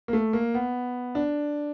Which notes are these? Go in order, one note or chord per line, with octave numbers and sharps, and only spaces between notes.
A#3
A3
A#3
B3
D4